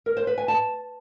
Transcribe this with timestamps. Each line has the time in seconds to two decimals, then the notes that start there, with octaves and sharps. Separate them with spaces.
0.06 A#4
0.17 C5
0.27 B4
0.38 G#5
0.48 A5